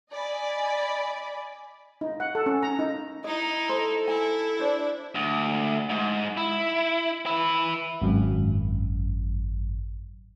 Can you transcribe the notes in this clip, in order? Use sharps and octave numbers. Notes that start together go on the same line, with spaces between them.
D5 D#5 G#5 B5
D#4
F#5
A4
C#4
A#5
D#4
D#4 E4 D#5
A4 C5
E4 G#5
D4 C5
D2
G#2
E4
E4 B4
G#1 F#2